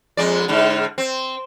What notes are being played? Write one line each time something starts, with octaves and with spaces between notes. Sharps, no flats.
F2 G#3 D5
G#2 D3
C4